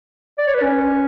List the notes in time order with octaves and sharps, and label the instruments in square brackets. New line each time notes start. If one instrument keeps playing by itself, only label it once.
[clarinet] D5
C#5
B4
C#4